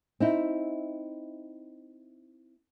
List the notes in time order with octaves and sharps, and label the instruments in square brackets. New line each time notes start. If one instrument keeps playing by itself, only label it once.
[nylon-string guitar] C4 D#4 E4